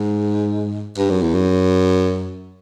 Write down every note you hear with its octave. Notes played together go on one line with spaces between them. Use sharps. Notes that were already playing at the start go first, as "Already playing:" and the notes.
Already playing: G#2
G2
F#2
E2
F#2